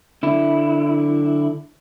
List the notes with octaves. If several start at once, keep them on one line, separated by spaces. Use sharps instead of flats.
D3 E4